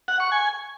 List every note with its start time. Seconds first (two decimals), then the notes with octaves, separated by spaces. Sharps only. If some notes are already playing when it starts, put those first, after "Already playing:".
0.08 F#5
0.20 C#6
0.32 G#5